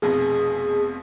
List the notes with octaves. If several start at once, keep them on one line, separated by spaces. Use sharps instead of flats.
F1 F2 B2 G#4